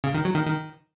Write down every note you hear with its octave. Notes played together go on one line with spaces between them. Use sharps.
C#3
D#3
F#3
D#3
D#3